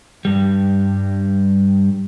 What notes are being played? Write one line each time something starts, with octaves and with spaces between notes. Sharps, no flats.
G2 G3